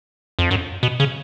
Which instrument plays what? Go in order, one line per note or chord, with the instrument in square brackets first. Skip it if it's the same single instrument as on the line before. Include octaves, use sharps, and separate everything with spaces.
[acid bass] F2
F#2
B2
C#3